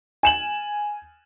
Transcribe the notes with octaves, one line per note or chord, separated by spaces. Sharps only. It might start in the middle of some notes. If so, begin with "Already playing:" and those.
G#5 E7 F#7